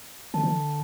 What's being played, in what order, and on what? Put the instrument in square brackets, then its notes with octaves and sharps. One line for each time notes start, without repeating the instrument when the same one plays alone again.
[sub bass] D3 [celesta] A5
[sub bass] E3
D3